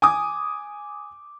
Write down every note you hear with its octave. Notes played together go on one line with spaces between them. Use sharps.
G#5 D6 D#6